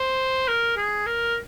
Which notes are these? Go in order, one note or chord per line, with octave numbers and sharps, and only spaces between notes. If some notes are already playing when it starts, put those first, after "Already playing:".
Already playing: C5
A#4
G#4
A#4